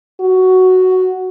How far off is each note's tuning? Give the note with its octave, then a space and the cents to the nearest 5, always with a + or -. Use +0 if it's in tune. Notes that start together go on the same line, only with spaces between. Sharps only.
F#4 +5